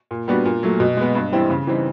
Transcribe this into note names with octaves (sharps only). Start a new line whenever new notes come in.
A#2
G3 B3 D4 F#4
A#2
F#3 A3
B2
G#3 B3
G2
E3 G3 C4 E4
C#3
E3 G3 C4 D#4